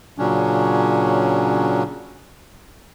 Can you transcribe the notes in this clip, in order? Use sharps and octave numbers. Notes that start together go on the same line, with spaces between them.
A#2 C#3 F#3 C#4 D4